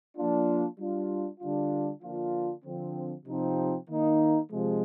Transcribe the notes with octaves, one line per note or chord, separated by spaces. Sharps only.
F3 A#3 D4 F4
G3 D4 F4
D3 G3 D4 F4
D3 F3 A#3 D4 F4
D3 F3 C4
C3 F3 C4 D#4
D#3 A#3 D#4
C3 F3 G#3